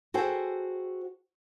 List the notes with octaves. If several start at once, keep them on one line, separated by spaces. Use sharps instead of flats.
F#4 G#4 A4 C5 G5